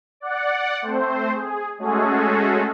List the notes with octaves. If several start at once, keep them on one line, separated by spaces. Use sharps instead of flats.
D5 F#5
A3 C4 C5
G#4
G#3 A3 C#4 F#4 G#4 A4